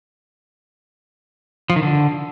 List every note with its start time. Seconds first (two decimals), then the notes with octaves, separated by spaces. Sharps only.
1.70 F3
1.76 D#3
1.83 D3